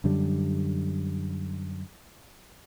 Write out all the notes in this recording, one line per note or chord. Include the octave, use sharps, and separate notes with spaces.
F#2 D3 G3